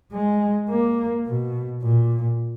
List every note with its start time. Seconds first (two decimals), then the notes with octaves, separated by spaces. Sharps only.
0.12 G#3
0.69 A#3
1.26 B2
1.83 A#2